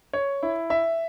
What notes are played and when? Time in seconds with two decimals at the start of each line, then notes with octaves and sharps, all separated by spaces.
0.13 C#5
0.43 E4
0.70 E5